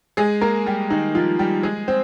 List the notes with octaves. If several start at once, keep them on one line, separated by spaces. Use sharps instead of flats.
G#3 G#4
A#3 A#4
G3 G4
D#3 D#4
F3 F4
G3 G4
G#3 G#4
C4 C5